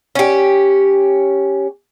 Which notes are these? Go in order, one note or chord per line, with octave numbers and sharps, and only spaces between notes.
C#4 G4